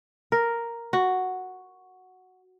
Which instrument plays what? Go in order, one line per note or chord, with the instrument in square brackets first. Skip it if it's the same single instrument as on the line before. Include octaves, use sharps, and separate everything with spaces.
[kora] A#4
F#4